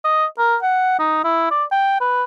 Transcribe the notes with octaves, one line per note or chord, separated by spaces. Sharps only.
D#5
A#4
F#5
D#4
E4
D5
G5
B4